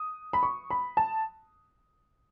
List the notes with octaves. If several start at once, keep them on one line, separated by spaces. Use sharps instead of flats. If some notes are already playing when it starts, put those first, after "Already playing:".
Already playing: D#6
B5
C#6
B5
A5